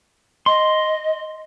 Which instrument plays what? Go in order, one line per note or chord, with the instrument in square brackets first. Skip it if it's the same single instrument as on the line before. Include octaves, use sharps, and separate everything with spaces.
[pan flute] D#5 [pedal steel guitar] C6